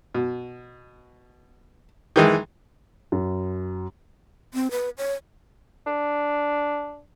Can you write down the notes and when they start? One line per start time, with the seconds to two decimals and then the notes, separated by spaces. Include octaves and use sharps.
0.15 B2
2.16 D#3 E3 G#3
3.12 F#2
4.54 C4
4.71 B4
4.98 C#5
5.87 D4